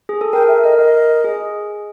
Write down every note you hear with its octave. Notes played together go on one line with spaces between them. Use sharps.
G#4
A4
A#4 G5
E5
A#4 D#5
A#4 D#5
G#4